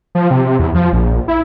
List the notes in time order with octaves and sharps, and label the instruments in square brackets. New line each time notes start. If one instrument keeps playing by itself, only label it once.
[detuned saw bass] F3
C3
E2
F3
A#1
E4